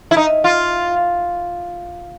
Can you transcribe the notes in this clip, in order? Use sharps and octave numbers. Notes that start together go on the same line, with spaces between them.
E4
D#4
F4